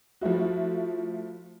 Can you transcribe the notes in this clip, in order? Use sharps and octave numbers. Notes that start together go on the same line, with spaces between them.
F3 A3 E4 F#4